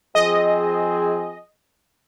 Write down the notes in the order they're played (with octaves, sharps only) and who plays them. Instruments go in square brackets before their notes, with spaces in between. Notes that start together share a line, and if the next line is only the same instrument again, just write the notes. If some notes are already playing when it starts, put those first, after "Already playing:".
[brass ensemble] F3 C4 G#4 [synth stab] D#5